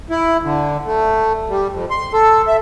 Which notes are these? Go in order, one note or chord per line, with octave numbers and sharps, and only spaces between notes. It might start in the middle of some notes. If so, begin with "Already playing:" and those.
E4
D3
A3
G3
F2
C6
A4
E5